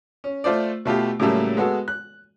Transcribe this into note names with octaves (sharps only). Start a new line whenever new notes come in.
C#4
A3 F4 C5 D5
B2 A3 F4 G4
A2 C#3 F#3 G3 A3 A#3
G#3 B3 F#4 A4
F#6